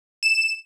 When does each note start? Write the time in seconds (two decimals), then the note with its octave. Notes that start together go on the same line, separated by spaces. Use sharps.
0.23 E7